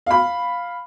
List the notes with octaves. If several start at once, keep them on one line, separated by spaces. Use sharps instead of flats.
F5 B5